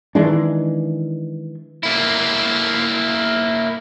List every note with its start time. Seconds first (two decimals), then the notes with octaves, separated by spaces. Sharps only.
0.15 D#3 E3 G#3 D4
1.83 A#3 E4